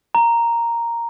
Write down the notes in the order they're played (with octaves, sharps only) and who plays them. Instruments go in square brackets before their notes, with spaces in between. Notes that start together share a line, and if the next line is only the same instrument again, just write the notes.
[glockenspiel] A#5